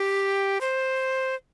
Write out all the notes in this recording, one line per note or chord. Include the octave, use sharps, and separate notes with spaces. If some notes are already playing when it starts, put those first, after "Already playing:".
Already playing: G4
C5